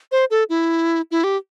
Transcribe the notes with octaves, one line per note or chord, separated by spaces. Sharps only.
C5
A4
E4
E4
G4